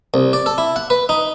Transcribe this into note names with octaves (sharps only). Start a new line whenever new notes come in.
C2
D5
A4
E4
F#5
B4
D#4